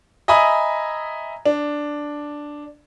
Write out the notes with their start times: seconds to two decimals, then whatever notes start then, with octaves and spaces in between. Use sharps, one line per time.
0.28 D#5 E5 G#5 A#5 B5 D#6
1.46 D4